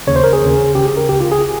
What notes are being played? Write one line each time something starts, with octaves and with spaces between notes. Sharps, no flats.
D#2 C#3 C#5
C5
A#4
G#4
D#2 C#3
C#2 C#3 G4
G#4
A#4
C#2 C#3 G4
F4
G#4